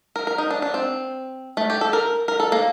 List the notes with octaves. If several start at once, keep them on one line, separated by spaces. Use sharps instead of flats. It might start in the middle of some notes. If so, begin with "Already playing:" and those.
A#4
A#4
D#4
D4
D4
C4
A3
G4
A4
A#4
A#4
A4
A#3